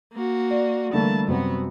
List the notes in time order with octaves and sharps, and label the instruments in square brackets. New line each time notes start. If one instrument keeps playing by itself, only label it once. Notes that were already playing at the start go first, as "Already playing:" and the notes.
[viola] A#3 F#4
[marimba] D5
[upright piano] D3 A3 A#3 [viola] E3 A5 [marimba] G3
[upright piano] F#2 C3 C4 [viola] B3 F#4